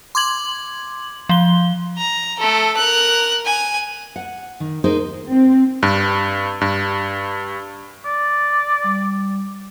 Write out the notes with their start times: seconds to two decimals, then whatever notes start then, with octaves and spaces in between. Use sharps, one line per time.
0.15 C6 D6 G#6 F#7
1.29 F3 G7
1.98 A#5
2.39 A3 A4
2.77 A#4 F#6
3.45 G#5
4.16 F#5
4.60 D#3
4.84 D#4 G#4 A#4 C5
5.29 C4
5.83 G2
6.61 G2
8.05 D5
8.84 G3